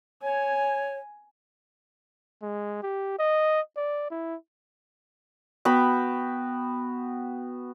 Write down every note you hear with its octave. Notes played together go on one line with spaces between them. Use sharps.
C#5 G#5
G#3
G4
D#5
D5
E4
B3 F#4 G5 B5